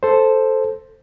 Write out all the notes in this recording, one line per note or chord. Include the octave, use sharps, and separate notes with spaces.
A4 C5